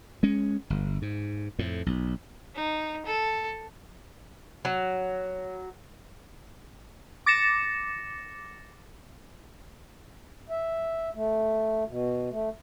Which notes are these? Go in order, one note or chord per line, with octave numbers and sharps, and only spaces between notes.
G#3 C#4
G1
G#2
F2 A2
B1
D#4
A4
F#3
D6 A6 A#6 C#7 E7
E5
A3
B2
A3